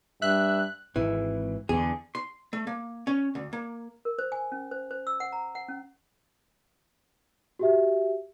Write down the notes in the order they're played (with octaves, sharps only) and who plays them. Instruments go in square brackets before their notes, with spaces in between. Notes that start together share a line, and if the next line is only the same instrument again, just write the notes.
[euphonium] G2 [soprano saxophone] E5 [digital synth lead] F#6
[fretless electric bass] G#1 [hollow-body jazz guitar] E3
[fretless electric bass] E2 D3 [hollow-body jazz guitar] G#4
[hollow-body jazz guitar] C6
A3
A#3
C#4
D2
A#3
[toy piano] A#4
C5
G#5
C#4
C5
C5
E6
F#5
A#5
F#5
C#4
[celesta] F#4 G4 E5